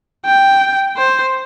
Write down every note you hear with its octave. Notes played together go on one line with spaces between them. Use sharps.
G5
C5